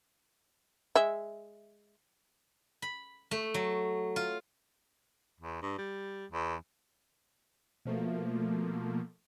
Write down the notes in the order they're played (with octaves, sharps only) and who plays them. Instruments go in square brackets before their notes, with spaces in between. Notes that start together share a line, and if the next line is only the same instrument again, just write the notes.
[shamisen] G#3 E5
[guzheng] B5
A3
F#3
F4
[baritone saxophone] E2
G2
G3
E2
[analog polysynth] B2 F3 A3 A#3